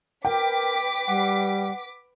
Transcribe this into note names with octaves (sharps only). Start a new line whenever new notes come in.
A#4 B4 G5 D6 B6
G3 F#5